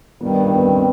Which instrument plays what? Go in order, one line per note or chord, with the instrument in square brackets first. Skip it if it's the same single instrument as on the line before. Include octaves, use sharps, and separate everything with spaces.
[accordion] G2 D#3 G3 [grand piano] B3
[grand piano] B3
C4
B3